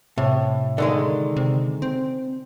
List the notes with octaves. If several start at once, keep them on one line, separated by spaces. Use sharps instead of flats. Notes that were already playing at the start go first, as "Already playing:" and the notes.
A2 C3
D3 D#3 G#3
C3
C4